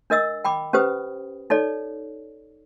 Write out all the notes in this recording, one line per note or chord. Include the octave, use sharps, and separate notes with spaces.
D4 A#4 D#5 E6
G5 B5 D6
C#4 G4 B4 C5 D#6
D#4 A4 C#5 D5